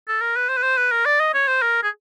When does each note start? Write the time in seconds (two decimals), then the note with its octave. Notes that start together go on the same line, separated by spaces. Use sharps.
0.08 A4
0.21 A#4
0.36 B4
0.49 C5
0.57 B4
0.63 C5
0.78 B4
0.91 A#4
1.06 D5
1.19 D#5
1.34 C#5
1.48 C5
1.62 A#4
1.83 G#4